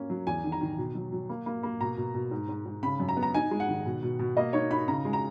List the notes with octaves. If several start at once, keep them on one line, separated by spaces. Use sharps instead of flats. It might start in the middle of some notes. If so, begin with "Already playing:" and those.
Already playing: A#3 C#4
F#3
E2 G#5
D#3
A#5
D#3
B2
F#3
F#3
A#3
A#3
A#3
B2 A#5
B2
B2
G#2
G#2
G#2
C#3 B5
F#2
A#5
B3
A#5
D#4 G#5
G#3
F#5
D#3
B2
B2
B2
A#3 D#5
D#4 C#5
D#4 B5
C#3 A#5
G#3
A#5